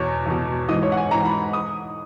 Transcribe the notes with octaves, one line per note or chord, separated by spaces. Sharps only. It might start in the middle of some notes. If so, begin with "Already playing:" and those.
Already playing: E2 B2 C#5
E2 B2
G#2 E3 D#5
C#5
F#5
G#5
G#2 E3 A#5
B5
D#6